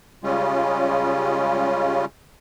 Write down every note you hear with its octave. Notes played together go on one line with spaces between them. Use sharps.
C#3 G3 G#3 C#4 F4